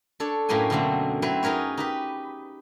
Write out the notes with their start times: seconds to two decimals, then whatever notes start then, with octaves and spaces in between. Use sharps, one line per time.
0.20 D4 A4 C#5
0.49 F#2 A2 A#3 B4 G5 G#5
0.70 B2 D3 F#3 A3 A#3 C4
1.22 F#3 C4 E4 B4 C5
1.43 D#4 G#4 A#4 B4 C#5
1.78 D#4 G4 B4